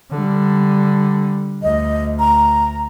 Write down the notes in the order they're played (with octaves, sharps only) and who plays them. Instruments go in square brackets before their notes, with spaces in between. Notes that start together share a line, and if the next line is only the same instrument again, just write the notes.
[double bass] D3 G3
[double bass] D2 [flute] D#5
[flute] A#5